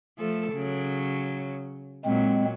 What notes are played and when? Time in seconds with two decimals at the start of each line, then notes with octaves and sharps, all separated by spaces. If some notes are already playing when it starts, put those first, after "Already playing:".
0.19 F3 A3 A4
0.52 C#3 F#3
2.05 A#2 F#3 G#3 C4